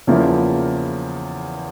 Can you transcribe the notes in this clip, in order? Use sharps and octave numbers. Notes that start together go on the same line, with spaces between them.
E2 C#3 F3 A#3 E4